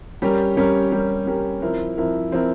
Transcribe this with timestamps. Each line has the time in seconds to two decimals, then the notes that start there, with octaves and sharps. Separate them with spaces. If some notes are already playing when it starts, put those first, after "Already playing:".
0.22 G3 C#4 G4 A#4
0.57 G3 C#4 G4 A#4
0.92 G3 C#4 G4 A#4
1.26 G3 C#4 G4 A#4
1.62 F3 C4 E4 A#4
1.97 F3 C4 E4 A#4
2.32 F3 C4 E4 A#4